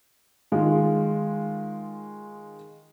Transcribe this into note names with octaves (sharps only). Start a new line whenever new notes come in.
D#3 G#3 F4